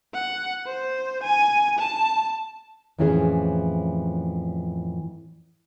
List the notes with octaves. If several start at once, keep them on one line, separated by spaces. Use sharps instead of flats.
F#5
C5
G#5
A5
F2 A2 E3 C#4 G4 G#4